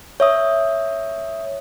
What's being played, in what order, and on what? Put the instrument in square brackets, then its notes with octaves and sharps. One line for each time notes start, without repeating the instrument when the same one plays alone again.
[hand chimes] C#5 E5 D#6